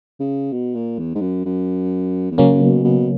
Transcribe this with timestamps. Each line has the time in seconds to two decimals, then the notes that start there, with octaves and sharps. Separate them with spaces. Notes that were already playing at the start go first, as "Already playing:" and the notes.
0.20 C#3
0.52 B2
0.75 A#2
0.98 E2
1.15 G#2
1.21 F#2
1.45 F#2
2.31 E2
2.38 F#2 C#3 F#3 A#3 C#4
2.61 B2
2.84 B2